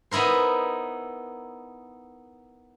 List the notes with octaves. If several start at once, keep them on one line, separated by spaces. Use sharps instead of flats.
B3 D#4 E4 A#4 C5